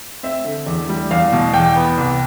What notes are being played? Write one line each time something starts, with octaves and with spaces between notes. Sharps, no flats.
C4 E5
D3
E2
G3
E2 F5
B2
E2 G5
B3
C2